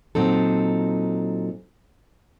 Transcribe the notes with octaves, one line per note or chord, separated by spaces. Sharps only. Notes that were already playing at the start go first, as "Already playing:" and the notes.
A#2 F#3 C4 D#4 A4